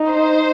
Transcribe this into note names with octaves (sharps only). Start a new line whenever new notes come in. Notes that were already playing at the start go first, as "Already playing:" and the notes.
Already playing: D#4
C5